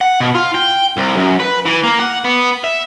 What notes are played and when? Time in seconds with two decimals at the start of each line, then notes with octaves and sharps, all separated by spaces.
0.01 F#5
0.20 B2
0.35 F4
0.55 G5
0.98 C2
1.17 F#2
1.40 B4
1.65 E3
1.83 A#3
1.99 F#5
2.24 B3
2.64 E5